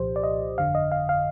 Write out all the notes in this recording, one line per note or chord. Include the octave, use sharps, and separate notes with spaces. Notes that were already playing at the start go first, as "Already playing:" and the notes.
Already playing: C2 A#2 F3 G4 C5
D5
D#5
G1 F2 D3 F5
D#5
F5
F5